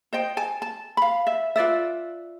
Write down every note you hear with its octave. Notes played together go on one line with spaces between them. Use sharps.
C5 D#5 G5
G#5 A5
A5
F5 B5
E5
F4 B4 D5 E5